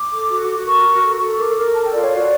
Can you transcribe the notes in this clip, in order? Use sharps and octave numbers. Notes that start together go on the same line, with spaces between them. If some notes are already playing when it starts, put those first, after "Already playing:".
Already playing: D6
A4
F#4
F#4
A#4 C#6
F#4
A4
A4
A#4 D6
A#4
A4 A5
G5
F4 D5
C#5
F#4 D5